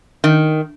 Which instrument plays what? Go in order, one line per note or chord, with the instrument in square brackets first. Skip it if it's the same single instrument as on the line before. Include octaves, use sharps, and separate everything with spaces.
[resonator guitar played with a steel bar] D#3